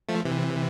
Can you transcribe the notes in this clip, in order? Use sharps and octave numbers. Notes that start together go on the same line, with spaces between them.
F3 A3
C3 E3